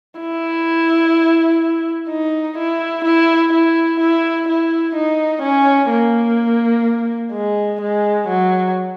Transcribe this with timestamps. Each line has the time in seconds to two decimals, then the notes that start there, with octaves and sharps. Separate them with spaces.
0.20 E4
2.10 D#4
2.58 E4
3.05 E4
3.53 E4
4.00 E4
4.49 E4
4.95 D#4
5.42 C#4
5.90 A#3
7.33 G#3
7.81 G#3
8.29 F#3